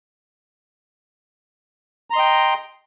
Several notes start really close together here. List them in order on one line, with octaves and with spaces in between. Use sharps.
A#5 C6 D#5 G5